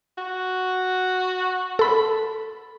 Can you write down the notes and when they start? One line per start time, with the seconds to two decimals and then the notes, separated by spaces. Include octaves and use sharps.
0.18 F#4
1.79 A4 B5